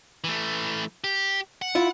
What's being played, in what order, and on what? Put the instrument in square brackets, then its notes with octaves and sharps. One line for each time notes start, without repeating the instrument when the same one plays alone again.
[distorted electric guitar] E3 A3
G4
F#5
[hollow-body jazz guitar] E4 F4